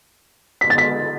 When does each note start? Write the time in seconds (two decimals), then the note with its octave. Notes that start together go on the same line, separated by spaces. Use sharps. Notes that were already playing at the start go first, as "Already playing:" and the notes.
0.61 B6
0.70 A6
0.78 B6